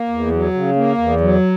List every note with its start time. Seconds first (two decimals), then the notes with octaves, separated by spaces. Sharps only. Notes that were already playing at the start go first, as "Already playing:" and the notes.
Already playing: A#3
0.09 E2
0.32 F#3
0.54 C#3
0.76 A#3
0.98 E2
1.20 F#3